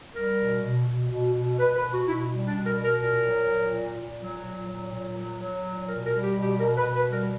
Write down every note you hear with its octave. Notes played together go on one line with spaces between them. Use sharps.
G3 A#4
B2
B2
B2
B2
B2
B2 B4
B4
B2
F#4
B2 E4
F#4
G3
D4
B2
A#4
B2
A#4
A#2 A#4
F#3
A#2
A#2
A#2
F#3
A#2
F#3
A#2
F#3
F#3
A#2
B2 A#4
A#4
G3
G4
B2
G4
B2 A#4
B4
B2
B4
G3
A#4